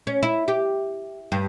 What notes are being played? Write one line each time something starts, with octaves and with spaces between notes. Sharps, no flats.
C#4
E4
G4
G2